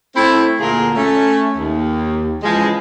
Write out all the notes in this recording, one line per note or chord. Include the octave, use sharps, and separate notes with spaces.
A3 C4 E4
D2 A#2 D3 F4 G#4 A#4
A3 C#4
D#2
C#3 E3 F3 G#3